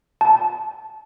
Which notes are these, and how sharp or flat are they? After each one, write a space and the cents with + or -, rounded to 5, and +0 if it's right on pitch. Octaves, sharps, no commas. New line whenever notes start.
A5 -15